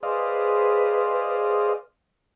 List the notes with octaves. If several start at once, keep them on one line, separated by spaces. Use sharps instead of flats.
G#4 B4 C5 D5 D#5 F5